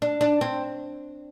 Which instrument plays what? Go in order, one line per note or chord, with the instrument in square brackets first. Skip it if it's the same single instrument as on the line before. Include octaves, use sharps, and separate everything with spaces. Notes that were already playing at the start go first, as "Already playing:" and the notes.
[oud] D4
D4
C4